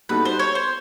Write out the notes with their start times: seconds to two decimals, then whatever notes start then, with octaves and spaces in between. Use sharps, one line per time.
0.09 G3 B3 D#4 F#4 A4 B4
0.25 C5
0.39 C#5
0.55 C5